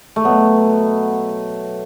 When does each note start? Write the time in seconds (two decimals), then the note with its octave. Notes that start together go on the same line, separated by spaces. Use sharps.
0.16 A3
0.24 B2 F#3 B3